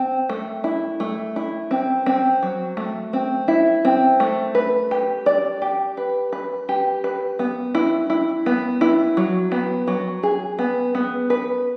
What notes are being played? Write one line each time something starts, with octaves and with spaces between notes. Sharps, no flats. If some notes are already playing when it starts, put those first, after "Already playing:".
Already playing: C4
A3
E4
A3
E4
C4
C4
F#3
A3
C4
E4
C4
A3
B4
G4
D5
G4
B4
B4
G4
B4
B3
E4
E4
B3
E4
F#3
B3
F#3
G#4
B3
B3
B4